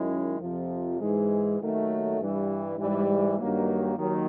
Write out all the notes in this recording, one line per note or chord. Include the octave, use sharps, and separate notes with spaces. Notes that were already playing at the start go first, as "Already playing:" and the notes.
Already playing: F#2 D#3 G#3 C#4 E4
F2 C3 F3
G#2 E3 G#3
D#2 D#3 F#3 A3
G2 E3 G3
G#2 E3 G3
G2 D#3 F#3 A#3
D#2 D#3 F#3